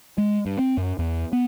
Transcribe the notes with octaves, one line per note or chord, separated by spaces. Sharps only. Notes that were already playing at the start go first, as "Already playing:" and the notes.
G#3
G2
C4
F#2
E2
B3